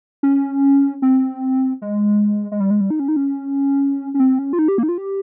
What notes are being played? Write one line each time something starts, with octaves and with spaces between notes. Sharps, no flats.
C#4
C4
G#3
G#3
G3
G#3
G3
D#4
C#4
D#4
C#4
C#4
C4
C#4
F4
D#4
G4
A#3
D#4
F4
G4